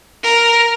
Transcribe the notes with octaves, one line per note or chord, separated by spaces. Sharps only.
A#4